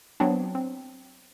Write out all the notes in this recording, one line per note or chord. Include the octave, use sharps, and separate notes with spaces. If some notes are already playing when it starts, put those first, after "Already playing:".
F#3 B3 C4 D4
C4